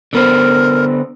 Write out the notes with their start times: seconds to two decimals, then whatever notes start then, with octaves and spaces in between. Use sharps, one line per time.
0.13 D3 B3 A#4 C5